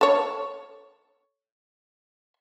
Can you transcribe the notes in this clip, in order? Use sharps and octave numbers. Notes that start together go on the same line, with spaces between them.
A4 C#5